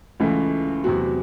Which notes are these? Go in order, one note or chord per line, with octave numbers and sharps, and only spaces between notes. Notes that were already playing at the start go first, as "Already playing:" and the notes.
C#2 C#3 E3 A3
E2 C3 F#3 C4 F#4